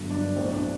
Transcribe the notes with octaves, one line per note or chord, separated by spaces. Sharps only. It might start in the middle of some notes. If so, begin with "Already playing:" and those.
Already playing: G1 G2 D3 F#3
D4
B1 A2 F#3 C4
D4